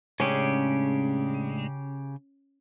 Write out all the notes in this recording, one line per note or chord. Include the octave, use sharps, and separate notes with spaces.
A2 C#3 G#3 C#4 D4 G4